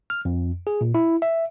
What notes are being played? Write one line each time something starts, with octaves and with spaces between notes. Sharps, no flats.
F6
F2
G#4
A#2
E4
E5